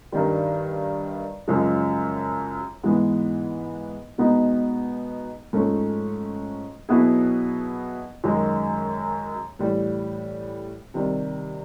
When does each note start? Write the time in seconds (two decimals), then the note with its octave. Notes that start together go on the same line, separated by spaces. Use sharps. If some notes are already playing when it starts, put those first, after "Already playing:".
0.12 G2 D#3 G3
1.48 F#2 C#3 F3 G#3
2.83 G#2 E3 G#3 B3
4.18 B2 G#3 B3 D#4
5.53 G#2 F3 A3 C#4
6.89 B2 F#3 B3 E4 G#4
8.24 F#2 D#3 G#3
9.59 A2 E3 G3
10.94 C3 D#3 G3